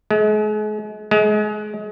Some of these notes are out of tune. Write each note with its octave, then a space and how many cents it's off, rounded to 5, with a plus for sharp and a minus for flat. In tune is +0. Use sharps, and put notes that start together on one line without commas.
G#3 +40
G#3 +30